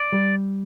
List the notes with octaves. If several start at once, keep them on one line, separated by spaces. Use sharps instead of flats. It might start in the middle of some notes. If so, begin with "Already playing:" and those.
Already playing: D5
G3